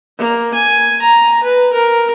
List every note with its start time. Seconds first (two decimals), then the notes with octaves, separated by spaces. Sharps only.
0.18 A#3
0.55 G#5
1.02 A#5
1.44 B4
1.73 A#4